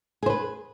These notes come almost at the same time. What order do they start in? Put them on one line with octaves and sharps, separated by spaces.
G#4 C5 B4